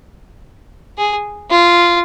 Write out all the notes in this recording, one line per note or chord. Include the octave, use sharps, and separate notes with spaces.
G#4
F4